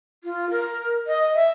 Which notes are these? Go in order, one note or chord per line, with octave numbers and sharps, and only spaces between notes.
F4
A#4
D#5
E5